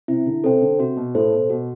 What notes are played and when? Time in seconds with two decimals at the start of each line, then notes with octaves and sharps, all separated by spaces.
0.08 C3 E4
0.26 D3
0.44 C3 A4 C5 G5
0.61 D3
0.79 C3 F#4
0.97 B2
1.15 A2 A4 C5
1.33 B2
1.50 B2 F#4